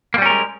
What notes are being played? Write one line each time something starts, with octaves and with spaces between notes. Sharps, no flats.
G3 G#3 A#3 C#4 A#4